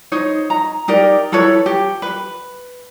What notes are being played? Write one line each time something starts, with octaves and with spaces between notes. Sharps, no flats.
D#4 C5 C#5
A#5
D#4 G4 A#4 D5
E4 A4 B4 C#5
G4
B4